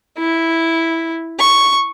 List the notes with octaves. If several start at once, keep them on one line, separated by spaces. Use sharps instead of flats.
E4
C#6